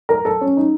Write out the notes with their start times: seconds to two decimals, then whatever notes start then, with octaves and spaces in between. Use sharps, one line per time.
0.09 A#4
0.25 A4
0.41 C#4
0.57 D#4